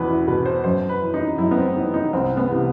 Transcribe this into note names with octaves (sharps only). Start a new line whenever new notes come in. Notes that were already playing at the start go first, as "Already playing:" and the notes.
Already playing: E2 B2 B4
E4
B2 B4
C5
F#2 C5
B4
E3
D#4
F#2 E4
B3
C4
E3 D#4
D#4
C2 C4
B3
C3 E3